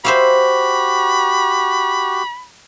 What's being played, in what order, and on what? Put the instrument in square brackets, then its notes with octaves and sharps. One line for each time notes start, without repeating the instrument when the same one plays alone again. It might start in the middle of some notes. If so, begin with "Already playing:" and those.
[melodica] F#4 G4 [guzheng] C5 E5 F5 [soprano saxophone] B5